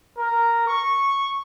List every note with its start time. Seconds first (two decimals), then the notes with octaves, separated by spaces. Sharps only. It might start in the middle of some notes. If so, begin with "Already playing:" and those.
0.18 A#4
0.68 C#6